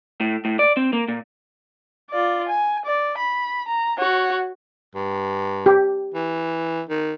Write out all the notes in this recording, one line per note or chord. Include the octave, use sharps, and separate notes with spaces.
A2
A2
D5
C4
A#3
A#2
F4 D5
G#5
D5
B5
A#5
F#4 C#5
G2
G4
E3
D#3